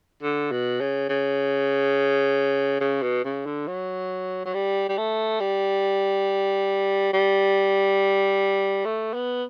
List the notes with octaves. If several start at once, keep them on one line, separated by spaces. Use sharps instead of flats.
D3
B2
C#3
C#3
C#3
B2
C#3
D3
F#3
F#3
G3
G3
A3
G3
G3
A3
B3